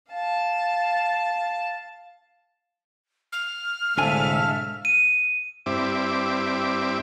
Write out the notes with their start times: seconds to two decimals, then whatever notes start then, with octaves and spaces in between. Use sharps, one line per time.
0.11 F5 A5
3.32 F6
3.97 C2 A2 D3 G#3 A4 E5 F5 G#5
4.85 D#7
5.66 G2 C4 E4 D6